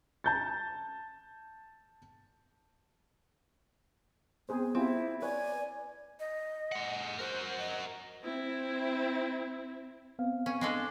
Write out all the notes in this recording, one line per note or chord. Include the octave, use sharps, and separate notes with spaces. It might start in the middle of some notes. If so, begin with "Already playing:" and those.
A5 G6 A6
B3 C4 G#4 C5
C4 E4 F4 G4
B4 C#5 D5 G#5
D#5
G#3 F#5
F#4 A#4 C5
D#5
C4 E4
B3 C4 F5
C#4
G#3 D4 A4